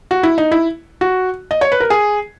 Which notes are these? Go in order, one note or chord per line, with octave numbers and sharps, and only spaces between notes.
F#4
E4
D#4
E4
F#4
D#5
C#5
B4
A#4
G#4